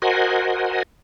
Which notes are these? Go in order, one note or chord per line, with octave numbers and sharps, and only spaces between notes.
F#4 A#4 C5 D#5 F#5 G#5